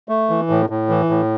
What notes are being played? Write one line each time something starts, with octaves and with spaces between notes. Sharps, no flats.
A3
E3
A2
A2
E3
A2